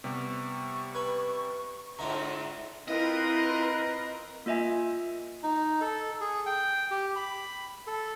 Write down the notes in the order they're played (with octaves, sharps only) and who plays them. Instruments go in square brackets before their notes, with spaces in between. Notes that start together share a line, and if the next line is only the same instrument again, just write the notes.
[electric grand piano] C3 G3 B3 [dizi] C#6
[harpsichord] B4 G#5
[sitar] G#2 D3 [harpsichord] F4 D#5 E5 [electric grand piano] A#5
[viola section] C4 A#4 A#5 [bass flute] E4 [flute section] F4 B4 [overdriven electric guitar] D#5
[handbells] A#3 F4 D#5 E5 G#5
[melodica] D#4
A4
G#4
G5
G4
B5
A4